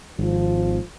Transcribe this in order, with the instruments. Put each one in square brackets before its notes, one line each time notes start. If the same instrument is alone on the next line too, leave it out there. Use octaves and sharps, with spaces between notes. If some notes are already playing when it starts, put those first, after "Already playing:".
[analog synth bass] G#1 [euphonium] F3